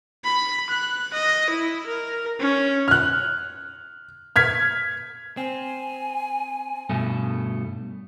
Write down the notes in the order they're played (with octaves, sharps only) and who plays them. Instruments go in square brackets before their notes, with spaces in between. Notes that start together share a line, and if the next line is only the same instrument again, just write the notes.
[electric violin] B5
F#6
D#5
E4
A#4
C#4
[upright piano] F6 F#6
F6 G#6 B6
[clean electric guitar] C4 [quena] G#5
[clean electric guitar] G2 B2 A3